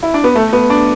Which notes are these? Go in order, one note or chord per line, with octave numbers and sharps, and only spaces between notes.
E4
D4
B3
A3
B3
D4